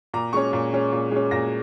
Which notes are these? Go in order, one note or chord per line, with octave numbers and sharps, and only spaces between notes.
A#2 A#5
G#3 C#4 C#6
A#2
G#3 C#4
A#2
G#3 C#4
A#2 A#6